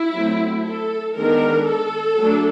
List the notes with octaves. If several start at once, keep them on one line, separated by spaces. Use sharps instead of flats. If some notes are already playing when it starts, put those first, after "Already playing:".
Already playing: E4
F#3 A3 C4
A4
D#3 G#3 B3 D4 A#4
A4
F#3 A3 D4